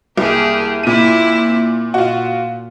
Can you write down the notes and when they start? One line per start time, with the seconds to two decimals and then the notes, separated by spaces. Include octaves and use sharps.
0.18 C2 A#3 G4 G#4
0.83 A#2 C4 E4 D#7
1.94 A#2 F4 F#4